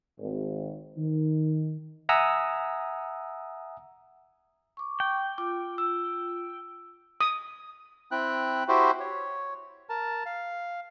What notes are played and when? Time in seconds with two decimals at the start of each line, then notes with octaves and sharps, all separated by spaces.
0.19 G#1
0.97 D#3
2.09 E5 F#5 G#5 A#5 D#6 E6
4.77 C#6 D6
5.00 G5
5.38 F4 D6
5.78 E6
7.21 D#6
8.11 C4 E4 G5 F#6
8.68 E4 F#4 G4 C5
9.00 C#5
9.89 A#4 A5
10.26 F5